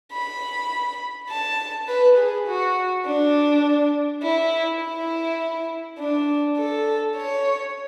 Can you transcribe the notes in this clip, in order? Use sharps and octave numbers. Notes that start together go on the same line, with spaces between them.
B5
A5
B4
G#4
F#4
D4
E4
E4
D4
A4
C#5